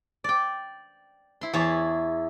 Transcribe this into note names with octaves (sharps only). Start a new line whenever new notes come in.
D5 G5
E4 C6
E2 E4 G#4 C#5 A5